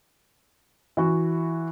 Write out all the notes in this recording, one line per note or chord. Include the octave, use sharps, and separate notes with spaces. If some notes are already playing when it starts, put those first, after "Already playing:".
E3 F#4